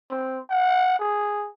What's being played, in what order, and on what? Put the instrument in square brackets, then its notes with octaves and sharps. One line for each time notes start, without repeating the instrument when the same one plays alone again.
[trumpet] C4
F#5
G#4